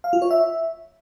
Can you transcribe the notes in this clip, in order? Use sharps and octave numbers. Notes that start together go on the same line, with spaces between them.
F5
F4
C#5
E5